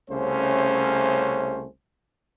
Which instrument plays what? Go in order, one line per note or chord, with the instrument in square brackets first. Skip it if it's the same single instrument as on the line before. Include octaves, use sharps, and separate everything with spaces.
[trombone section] C2 C#3 A3 C#4 C5